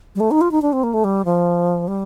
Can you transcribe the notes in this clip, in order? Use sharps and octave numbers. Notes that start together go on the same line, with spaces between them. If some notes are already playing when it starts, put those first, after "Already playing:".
G3
A3
D#4
F4
D#4
D4
C4
A#3
A3
G3
F3
G3